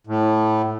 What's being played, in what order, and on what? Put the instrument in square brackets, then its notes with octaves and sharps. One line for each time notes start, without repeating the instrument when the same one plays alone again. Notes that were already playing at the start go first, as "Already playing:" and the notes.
[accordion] A2